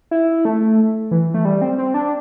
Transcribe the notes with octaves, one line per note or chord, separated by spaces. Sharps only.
E4
A3
E3
A3
G3
C4
C4
D4